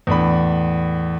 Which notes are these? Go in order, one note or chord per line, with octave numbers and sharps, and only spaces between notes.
E2 A2 D4 B5